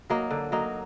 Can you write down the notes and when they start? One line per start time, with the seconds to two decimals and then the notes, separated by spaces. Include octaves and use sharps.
0.10 F#3 A#3 D#4
0.31 D3
0.52 F#3 A#3 D#4